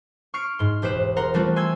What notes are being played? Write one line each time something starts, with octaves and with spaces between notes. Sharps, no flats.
C#6 F6 C7 D7
G#2 C6
E1 G4 B4 C5 E7
A#4 F#5 A#5 C6
E3 G3 A3 C4 F4 F#4
G#5 C6 E6 G#6